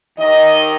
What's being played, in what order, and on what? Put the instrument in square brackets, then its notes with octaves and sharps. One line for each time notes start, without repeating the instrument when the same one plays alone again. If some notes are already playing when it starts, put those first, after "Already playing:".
[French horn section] D#2 D#3 D#5